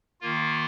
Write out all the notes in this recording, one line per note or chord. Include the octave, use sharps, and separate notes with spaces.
D#3 A#3 F4